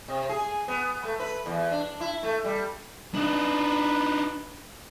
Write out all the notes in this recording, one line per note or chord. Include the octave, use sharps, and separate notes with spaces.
C3
G#4
B3
A3
B4
E2
D4
E4
A3
G3
D4 D#4 B4